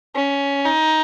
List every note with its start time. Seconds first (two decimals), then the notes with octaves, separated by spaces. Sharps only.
0.16 C#4
0.66 D#4